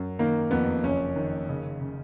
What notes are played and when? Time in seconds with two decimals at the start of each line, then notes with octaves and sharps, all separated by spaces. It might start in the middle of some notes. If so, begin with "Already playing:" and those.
Already playing: F#2
0.19 D#3 A#3
0.51 F2 B3
0.84 F#1 C#4
1.16 D#3
1.49 C#3
1.81 C#3